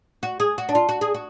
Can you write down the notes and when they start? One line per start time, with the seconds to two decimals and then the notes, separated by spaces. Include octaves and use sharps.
0.23 F#4
0.40 G#4
0.58 F#4
0.69 D4
0.75 F4
0.89 F#4
1.01 G#4
1.14 F#4